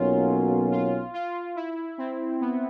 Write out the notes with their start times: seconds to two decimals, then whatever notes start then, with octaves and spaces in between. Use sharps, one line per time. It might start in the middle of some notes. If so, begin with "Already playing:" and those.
Already playing: B1 B2 F#3 A#3 C#4 F4
0.72 F4
1.14 F4
1.56 E4
1.98 C4
2.41 B3